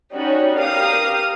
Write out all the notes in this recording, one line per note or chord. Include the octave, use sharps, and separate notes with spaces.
G3 C#4 D#4 F#4
G4 A#4 F5 D#6